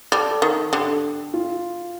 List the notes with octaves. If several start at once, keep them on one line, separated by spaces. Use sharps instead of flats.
G3 A4
D#3
D3 G4
F4